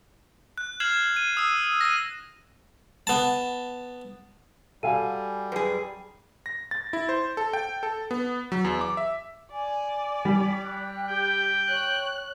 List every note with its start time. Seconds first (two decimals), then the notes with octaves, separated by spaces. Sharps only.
0.58 F#6
0.80 F6 G#6 C7 E7 F#7
1.16 D#7
1.37 D#6 E6
1.81 A#6 D#7
3.07 B3 A5
4.83 G3 F#4 A4 F5 F#5 G#5 D#7
5.52 F#2 G#4 B4
6.46 A#6
6.71 A6
6.93 E4
7.09 C5
7.37 A4
7.53 G5
7.83 A4
8.11 B3
8.52 F#3
8.65 E2
8.81 D6
8.97 E5
9.52 D5 G#5
10.25 G3
10.65 G5 F#6
11.08 G4 G5
11.68 C#5 F#6